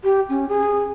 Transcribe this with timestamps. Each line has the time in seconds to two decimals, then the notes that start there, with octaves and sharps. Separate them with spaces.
0.04 G4
0.29 C#4
0.49 G#4